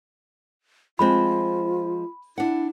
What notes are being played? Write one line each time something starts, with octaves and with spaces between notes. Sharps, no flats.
F3 G#3 C4 F4 B5
D4 E4 F#5